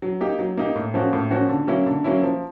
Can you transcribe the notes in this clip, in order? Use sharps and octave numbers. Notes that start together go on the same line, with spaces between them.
F#3
A#3 D#4 G4
F#3
A#3 D#4 G4
A2
F3 A#3 C#4 F#4
A2
F3 A#3 C#4 F#4
D3
F#3 A#3 C#4 E4
D3
F#3 A#3 C#4 E4
F3